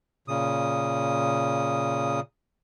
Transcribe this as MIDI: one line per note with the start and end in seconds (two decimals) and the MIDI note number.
0.28 2.20 46
0.28 2.20 49
0.28 2.20 87